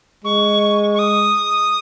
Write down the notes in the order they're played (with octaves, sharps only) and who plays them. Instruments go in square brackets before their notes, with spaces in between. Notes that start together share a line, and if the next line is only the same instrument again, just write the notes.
[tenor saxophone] G#3 [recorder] C#6
[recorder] C#6
D#6